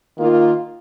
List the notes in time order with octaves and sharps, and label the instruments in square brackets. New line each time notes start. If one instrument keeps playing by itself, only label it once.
[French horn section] D#3 A#3 F4